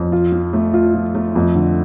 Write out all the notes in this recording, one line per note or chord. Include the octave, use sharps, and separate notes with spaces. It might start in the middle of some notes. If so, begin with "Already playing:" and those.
Already playing: F2
F4
F3
A3
F4
F3
A3
F2
D3